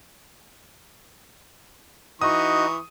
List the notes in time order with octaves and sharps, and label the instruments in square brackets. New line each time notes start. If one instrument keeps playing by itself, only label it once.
[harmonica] E3 C#6 [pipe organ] D#4 F#4 D#5 [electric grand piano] D#6